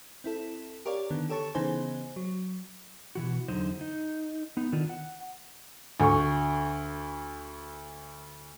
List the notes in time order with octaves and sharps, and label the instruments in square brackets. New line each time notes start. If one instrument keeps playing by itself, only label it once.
[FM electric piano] C4 E4 A4
G4 A#4 C#5 D5 F5
D3 D#3 B3
G4 A4 C#5 A5 C#6
C#3 E3 B3 D#4 C5 G#5
F#3
[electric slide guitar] B2 E3 F#4
E2 D3 F#3 D#4 C5
D#4
B3 D#4
D3 D#3 D4 F4
F#5
[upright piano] D2 C#6